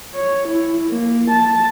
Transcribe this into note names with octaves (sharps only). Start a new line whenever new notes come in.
C#5
E4
A#3
A5